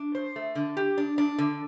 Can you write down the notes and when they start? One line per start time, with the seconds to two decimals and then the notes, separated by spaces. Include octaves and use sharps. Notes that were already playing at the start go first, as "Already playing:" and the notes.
Already playing: D4
0.15 C5
0.36 A3
0.55 D3
0.77 G4
0.98 D4
1.18 D4
1.38 D3